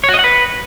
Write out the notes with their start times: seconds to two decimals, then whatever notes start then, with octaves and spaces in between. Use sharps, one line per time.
0.04 C#5
0.09 F#4
0.14 D#5
0.19 F#5
0.24 B4